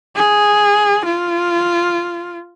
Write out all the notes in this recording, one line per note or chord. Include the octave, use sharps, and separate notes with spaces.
G#4
F4